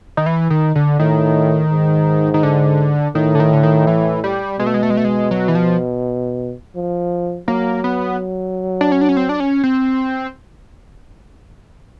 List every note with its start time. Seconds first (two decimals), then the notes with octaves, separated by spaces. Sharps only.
0.17 D#3
0.26 E3
0.50 D#3
0.75 D3
1.00 A2 D#3
1.71 G#2
2.34 D#3
2.43 D3
3.15 A2 D#3
3.35 D3
3.40 D#3
3.53 D3
3.63 D#3
3.87 E3
4.24 G3
4.59 B2 G#3
4.67 A3
4.74 G#3
4.83 A3
4.90 G#3
4.97 A3
5.05 G#3
5.31 F#3
5.48 E3
5.55 F3
6.76 F3
7.48 F#3 A#3
7.84 B3
8.81 D4
8.92 C#4
9.01 D4
9.09 C#4
9.17 C4
9.29 D4
9.40 C#4
9.64 C4